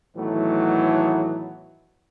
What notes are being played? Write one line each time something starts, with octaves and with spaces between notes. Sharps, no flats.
A2 D#3 E3 F#3 A3 B3